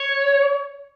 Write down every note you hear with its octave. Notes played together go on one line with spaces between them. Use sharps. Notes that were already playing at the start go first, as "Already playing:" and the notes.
Already playing: C#5